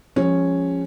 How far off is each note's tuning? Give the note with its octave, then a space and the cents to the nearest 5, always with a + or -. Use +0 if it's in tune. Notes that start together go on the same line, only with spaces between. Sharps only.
F3 +0 G#3 -25 C#4 -5